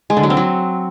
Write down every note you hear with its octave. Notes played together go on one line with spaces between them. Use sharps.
G#3
D3
F#3
C4
F#3